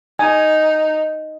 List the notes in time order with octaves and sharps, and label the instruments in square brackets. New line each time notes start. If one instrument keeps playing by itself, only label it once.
[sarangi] D#4 [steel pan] G#5